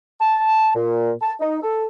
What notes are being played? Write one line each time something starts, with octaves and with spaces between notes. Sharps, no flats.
A5
A#2
A5
D#4
A4